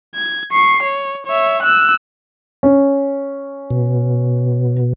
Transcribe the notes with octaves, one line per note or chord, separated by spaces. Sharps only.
G#6
C#6 C7
C#5
C#5 E5
E6 F#6
C#4
B2